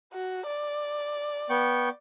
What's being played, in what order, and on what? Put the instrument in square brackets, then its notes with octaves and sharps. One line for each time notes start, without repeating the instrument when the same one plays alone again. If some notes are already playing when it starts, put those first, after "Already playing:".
[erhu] F#4
D5
[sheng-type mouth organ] B3 G5 C#6